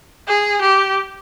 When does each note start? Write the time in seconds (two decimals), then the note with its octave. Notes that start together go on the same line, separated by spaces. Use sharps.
0.28 G#4
0.61 G4